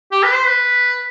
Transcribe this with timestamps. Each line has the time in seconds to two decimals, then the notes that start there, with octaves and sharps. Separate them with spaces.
0.12 G4
0.23 B4
0.34 C5
0.45 B4